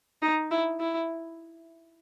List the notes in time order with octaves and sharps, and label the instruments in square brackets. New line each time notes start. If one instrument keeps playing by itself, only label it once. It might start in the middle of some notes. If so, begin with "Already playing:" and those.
[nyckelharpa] D#4
E4
E4